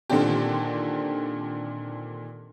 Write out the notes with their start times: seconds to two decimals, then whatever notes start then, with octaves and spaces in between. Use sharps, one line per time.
0.10 A#2 D3 D#3 C4 D4 G4